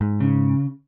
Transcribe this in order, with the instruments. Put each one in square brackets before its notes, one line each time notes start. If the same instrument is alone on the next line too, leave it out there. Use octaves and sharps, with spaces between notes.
[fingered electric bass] G#2
[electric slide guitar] C#3